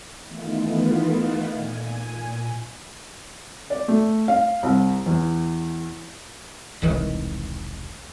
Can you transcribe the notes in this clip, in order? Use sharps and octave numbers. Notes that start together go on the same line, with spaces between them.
D#3 E3 A3 B3 F4
A#2 G#5
D5
A3
F5
C2
E2
E1 C2 D#3 E3